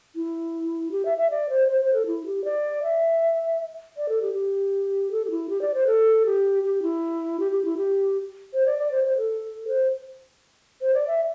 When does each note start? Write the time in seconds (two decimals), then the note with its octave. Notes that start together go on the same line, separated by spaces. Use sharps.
0.16 E4
0.92 G4
1.05 E5
1.18 E5
1.31 D5
1.49 C5
1.68 C5
1.81 C5
1.93 A4
2.06 E4
2.26 G4
2.45 D5
2.83 E5
3.97 D5
4.09 A4
4.22 G4
4.34 G4
5.11 A4
5.25 G4
5.31 E4
5.50 G4
5.62 D5
5.74 C5
5.87 A4
6.26 G4
6.63 G4
6.82 E4
7.40 G4
7.52 G4
7.65 E4
7.77 G4
8.54 C5
8.66 D5
8.79 D5
8.91 C5
9.04 C5
9.17 A4
9.68 C5
10.81 C5
10.94 D5
11.07 E5